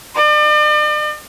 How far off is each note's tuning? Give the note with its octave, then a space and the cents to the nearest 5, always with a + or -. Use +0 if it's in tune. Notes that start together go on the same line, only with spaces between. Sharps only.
D5 +40